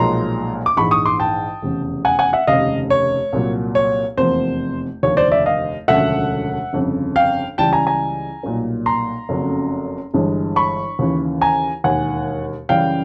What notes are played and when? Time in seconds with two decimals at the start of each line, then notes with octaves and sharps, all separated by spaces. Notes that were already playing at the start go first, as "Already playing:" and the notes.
Already playing: B1 A#2 F3 G#3 A#5 C6
0.66 D6
0.77 A#1 G#2 E3 G#3 B5 C#6
0.91 C#6 D#6
1.06 C6 D6
1.20 G5 A5
1.62 F1 E2 C#3
2.05 F#5 G#5
2.19 F#5 G#5
2.33 E5 F#5
2.47 F1 D#2 C#3 D#5 F5
2.90 C#5
3.33 C2 A#2 F#3
3.75 C#5
4.17 F1 E2 C3 F3 A#3 C5
5.03 F1 D#2 D3 F3 C#5
5.17 C5 D5
5.32 D5 E5
5.46 D#5 F5
5.88 E1 D2 C#3 F3 A3 E5 F#5
6.73 G1 F2 C#3
7.16 F5 G5
7.58 C#2 C#3 E3 G3 G5 A5
7.73 G#5 A#5
7.87 G#5 A#5
8.43 B1 A#2 G3 A#3
8.86 A#5 C6
9.29 F#1 F2 C#3 F#3 A3
10.14 G1 G2 E3 G#3
10.56 B5 C#6
10.99 D#2 C#3 E3
11.41 G#5 A#5
11.84 E1 D#2 D#3 F#5 G#5
12.69 F#2 C#3 E3 G3 F5 G5